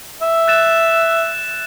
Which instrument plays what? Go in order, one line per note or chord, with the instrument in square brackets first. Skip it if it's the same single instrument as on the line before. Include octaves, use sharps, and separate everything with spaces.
[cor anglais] E5
[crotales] F#6 A6 E7